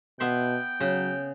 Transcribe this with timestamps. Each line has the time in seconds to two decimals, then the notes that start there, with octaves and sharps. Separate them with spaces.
0.20 B2 B3 E5 G5 C6
0.80 C#3 F#3